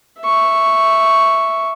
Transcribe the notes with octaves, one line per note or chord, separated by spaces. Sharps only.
E5 C#6